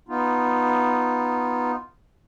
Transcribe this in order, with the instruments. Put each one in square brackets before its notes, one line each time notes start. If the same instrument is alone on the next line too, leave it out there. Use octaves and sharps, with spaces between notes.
[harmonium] B3 D#4 F4